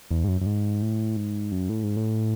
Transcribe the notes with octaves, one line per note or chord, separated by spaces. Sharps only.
E2
G#2
F#2
F#2
G#2
A2
G#2
F#2
A2
G#2
A2